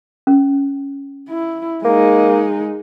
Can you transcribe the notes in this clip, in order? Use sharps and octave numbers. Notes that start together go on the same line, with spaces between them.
C#4
E4
G#3 A#3 D#4